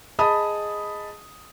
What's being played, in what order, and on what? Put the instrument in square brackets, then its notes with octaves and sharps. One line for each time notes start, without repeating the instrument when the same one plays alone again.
[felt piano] G#4 D#5 A5 B5 D#6